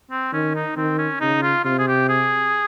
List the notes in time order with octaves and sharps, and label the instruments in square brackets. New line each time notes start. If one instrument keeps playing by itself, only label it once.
[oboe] C4
[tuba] D#3 [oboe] C#4
[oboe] D#4
[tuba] D#3 [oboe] C4
[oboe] C#4
[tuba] C#3 [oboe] D#4
[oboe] F4
[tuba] C3 [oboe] F4
[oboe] G#4
G4
G#4